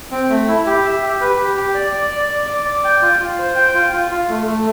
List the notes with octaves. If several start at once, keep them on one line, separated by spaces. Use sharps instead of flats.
C4
A3
E4
G4
E5
G4
B4
G4
G4
D5
D5
D5
D5
D5
D5
G5
F4
F4
C5
G5
F4
F4
F4
A3
A3